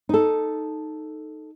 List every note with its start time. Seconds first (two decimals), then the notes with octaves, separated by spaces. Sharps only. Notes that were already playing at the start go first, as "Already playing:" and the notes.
0.09 D#4 A4